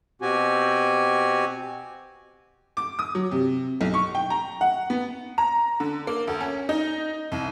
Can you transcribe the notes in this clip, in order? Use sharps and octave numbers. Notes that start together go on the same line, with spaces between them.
B2 C4 F#4 G4 G#5
D6
D#6
F#3
C3
B1
C#6
G5
A#5
F#5
B3
A#5
D3
A#3
D2
C#4
D#4
C2